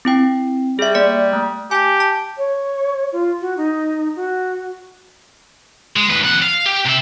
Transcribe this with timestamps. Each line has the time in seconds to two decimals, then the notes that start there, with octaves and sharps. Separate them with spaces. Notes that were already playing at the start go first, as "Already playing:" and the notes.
0.05 C4 E4 G5
0.79 G3 G#4 E5
0.95 A#3 D5 C#7
1.33 A3
1.71 G4 G#5 A5
2.00 A5
2.37 C#5
3.12 F4
3.41 F#4
3.57 D#4
4.16 F#4
5.96 G#3
6.10 D#2 B4
6.23 F2 F#5
6.42 F5
6.66 G4
6.85 C3 E5